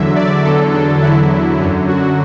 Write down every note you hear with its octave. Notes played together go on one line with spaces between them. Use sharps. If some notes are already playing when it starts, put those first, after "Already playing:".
Already playing: E2 D3 F#3 E5
D5
E2 D3 F#3 A4
D4
E2 D3 F#3 E4
F#2 D3 F#3
F#4